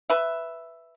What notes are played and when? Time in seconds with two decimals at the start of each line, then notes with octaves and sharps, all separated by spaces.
0.10 B4 E5